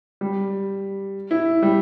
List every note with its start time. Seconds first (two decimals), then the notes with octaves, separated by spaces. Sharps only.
0.21 G3
1.31 E4
1.62 G3